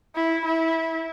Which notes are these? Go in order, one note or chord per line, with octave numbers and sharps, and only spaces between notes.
E4
E4